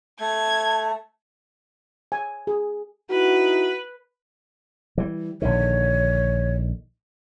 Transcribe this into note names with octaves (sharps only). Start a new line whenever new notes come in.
A3 A5 G#6
G#5
G#4
D#4 E4 F#4 B4
E3 G3
A#1 D3 D#3 C#5